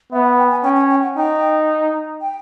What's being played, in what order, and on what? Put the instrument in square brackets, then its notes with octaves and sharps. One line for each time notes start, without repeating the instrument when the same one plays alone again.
[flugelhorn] B3 [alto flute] E5
[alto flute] F#5
G5
G#5
[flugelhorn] C#4 [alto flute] G5
[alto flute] G#5
G5
F#5
[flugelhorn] D#4 [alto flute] G5
[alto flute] G5